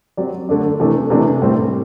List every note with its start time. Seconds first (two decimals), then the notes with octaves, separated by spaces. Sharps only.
0.17 F#3 C4 G4 D5
0.49 D3 A3 D4
0.80 C3 E3 A3 D4
1.10 C3 E3 A3 D4
1.42 A2 G3 C4